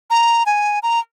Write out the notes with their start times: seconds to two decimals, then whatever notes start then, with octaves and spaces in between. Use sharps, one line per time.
0.10 A#5
0.46 G#5
0.83 A#5